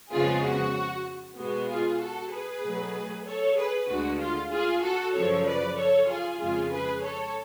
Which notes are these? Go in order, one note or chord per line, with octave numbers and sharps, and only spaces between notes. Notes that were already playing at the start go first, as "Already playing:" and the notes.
F2 C#3 F3 G#3 B3 F4 G#4
F#4
B2 G#3 B3 F#4
F4 G#4
F#4 A4
G#4 B4
B2 F#3 A3
A4 C#5
G#4 B4
D2 D3 G#3 F#4
F4
F4 G#4
F#4 A4
F#2 C#3 F3 A4 C#5
B4 D5
A4 C#5
F4 G#4
F2 C#3 G#3 F4 G#4
G#4 B4
A4 C#5